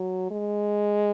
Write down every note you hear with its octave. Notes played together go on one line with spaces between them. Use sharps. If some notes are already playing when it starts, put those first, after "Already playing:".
Already playing: F#3
G#3